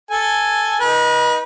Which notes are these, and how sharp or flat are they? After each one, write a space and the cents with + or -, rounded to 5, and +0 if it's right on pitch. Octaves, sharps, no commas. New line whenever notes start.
A4 +0 G#5 +0
D#4 +0 B4 -35